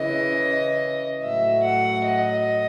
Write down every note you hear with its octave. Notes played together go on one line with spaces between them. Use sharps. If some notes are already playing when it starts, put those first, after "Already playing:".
Already playing: C#3 E3 D#5
A2 F#3 E5
F#5
D#5